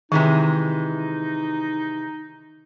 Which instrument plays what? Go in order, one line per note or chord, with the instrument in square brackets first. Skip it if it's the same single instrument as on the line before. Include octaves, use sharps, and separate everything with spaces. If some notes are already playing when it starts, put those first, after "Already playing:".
[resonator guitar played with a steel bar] C3 E3 G#3 [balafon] D#3 [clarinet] D#4